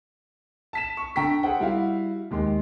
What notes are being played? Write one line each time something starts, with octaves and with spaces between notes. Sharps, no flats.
A5 B6 E7
C#6
D3 A4 G5 A#5 C#6 B6
G#4 A4 C5 F#5 G5
G3 E4 F#4 F5
D#2 G#3 G4 C6